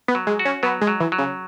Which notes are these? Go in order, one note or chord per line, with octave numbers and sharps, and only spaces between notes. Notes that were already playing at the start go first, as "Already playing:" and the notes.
B3
F#3
G#3
F#4
C#4
F#3 B3
G#3
F#3
E3
F#3
C#3